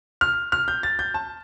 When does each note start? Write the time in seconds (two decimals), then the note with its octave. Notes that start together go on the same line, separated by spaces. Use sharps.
0.21 F6
0.52 F6
0.68 G6
0.83 A6
0.99 G6
1.14 A5